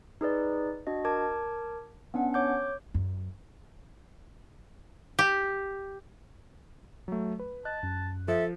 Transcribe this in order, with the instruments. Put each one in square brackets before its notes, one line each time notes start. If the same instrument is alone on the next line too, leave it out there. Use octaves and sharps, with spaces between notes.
[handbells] D#4 G#4 B4 D5
D4 F#4 D#5
A#4 A5 D6 G#6
B3 C#4 D4 F#5
C#5 D6 G6
[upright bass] F#2
[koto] G4
[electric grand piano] F#3 A3
B4
[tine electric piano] D#5 [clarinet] A5 [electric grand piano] F#6
[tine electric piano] F#2
[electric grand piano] F3 [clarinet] A4 [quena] E5